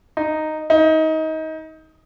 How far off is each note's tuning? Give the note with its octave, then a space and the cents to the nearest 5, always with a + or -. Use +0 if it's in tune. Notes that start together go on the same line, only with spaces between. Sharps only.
D#4 -5
D#4 +25